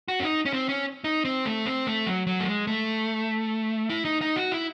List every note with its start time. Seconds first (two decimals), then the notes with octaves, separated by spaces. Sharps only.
0.08 F#4
0.20 C#4
0.24 D#4
0.45 C#4
0.53 C4
0.69 C#4
1.04 D#4
1.25 C4
1.46 A3
1.66 C4
1.87 A3
2.07 F#3
2.27 F#3
2.40 A3
2.48 G#3
2.67 A3
3.90 E4
4.05 D#4
4.21 D#4
4.36 F#4
4.52 E4